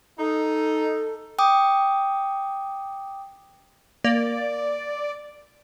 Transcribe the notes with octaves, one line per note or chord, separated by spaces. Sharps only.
D#4 A4
G5 D6 D#6
A#3 D5